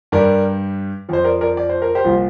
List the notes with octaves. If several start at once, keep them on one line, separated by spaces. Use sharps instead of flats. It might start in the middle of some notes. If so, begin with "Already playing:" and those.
G2 G3 A#4 D5
F2 F3 C5
A#4 D5
A#4 D5
D5
C5
A#4
G4 C5
C2 A#2 F3